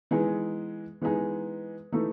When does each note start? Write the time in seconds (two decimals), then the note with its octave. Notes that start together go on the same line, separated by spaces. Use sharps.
0.11 E3 G#3 B3 D#4 G#4
1.02 E3 G#3 B3 D#4 G#4
1.92 E3 A3 D#4 A4